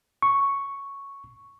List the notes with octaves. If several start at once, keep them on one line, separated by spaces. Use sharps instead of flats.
C#6